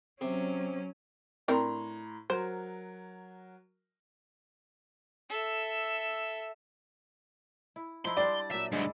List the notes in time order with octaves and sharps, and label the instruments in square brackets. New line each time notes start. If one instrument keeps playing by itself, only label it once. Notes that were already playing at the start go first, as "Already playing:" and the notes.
[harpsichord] C3 [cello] F#3 C#4
[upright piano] A2 A#5 C6 [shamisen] C4 D4 A#4
[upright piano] F#3 A#4 [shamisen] C5
[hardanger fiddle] A4 E5
[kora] E4
[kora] F3 D#4 E4 [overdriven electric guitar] C6
[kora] G3 D4 G4 [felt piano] D5
[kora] A#2 F#3 [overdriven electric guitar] E5
[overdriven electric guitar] D2 G2 [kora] G#3 E4